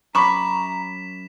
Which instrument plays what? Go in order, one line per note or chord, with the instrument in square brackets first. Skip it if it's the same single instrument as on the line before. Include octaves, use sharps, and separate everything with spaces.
[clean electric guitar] F#2 [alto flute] A#5 [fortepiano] B5 C#6 D6 [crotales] B6 E7